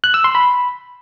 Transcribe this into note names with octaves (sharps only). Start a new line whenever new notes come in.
F#6
E6
C6
B5